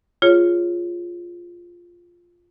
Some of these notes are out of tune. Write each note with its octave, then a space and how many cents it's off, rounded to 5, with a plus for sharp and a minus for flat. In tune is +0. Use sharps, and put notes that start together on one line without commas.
F4 +0 G#4 +0 C#5 +0